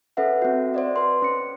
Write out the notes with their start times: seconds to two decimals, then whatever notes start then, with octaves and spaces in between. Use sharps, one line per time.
0.17 C#4 A4 B4 E5 F#5
0.42 C4 F#4
0.74 C5 D5 D#5
0.96 B4 C6
1.22 C#4 C#7